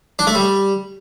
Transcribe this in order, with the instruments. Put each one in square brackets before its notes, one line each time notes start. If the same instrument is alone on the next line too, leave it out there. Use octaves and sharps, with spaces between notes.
[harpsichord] D4
A3
G3